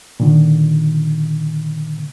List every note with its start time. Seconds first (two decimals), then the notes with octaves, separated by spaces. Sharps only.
0.20 A#2 D3 D#3